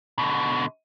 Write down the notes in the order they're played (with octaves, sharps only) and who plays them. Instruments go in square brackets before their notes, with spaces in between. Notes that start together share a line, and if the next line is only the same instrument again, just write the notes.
[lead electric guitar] B2 D3